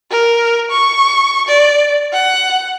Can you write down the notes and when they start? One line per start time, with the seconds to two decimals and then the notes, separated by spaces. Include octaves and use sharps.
0.11 A#4
0.71 C#6
1.48 D5
2.13 F#5